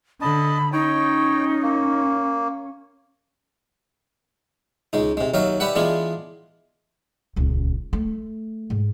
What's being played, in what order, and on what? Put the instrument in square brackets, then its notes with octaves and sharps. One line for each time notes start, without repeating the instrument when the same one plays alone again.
[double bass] D3 [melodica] D#5 A5 [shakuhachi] B5
[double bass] C#4 [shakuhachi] D#4 [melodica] C#5 G5
[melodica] A#3
[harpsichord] C#2 G#3 D#4
C3 G#3
D#2 F#3 D#4 E5 F5
G3 G4 B4 E5 F#5
E3 G#3 B3 D4 F4 G#4
[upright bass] D#1 C#2
A3
G#2